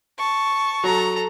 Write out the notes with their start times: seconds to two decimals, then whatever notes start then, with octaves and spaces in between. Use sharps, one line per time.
0.18 A5 C#6
0.84 F#3 A4 A#5